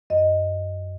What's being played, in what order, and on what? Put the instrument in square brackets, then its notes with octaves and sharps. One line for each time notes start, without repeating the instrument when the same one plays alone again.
[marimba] F#2 D#5